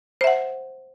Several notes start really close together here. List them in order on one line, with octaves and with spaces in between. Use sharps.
C5 E5 F#5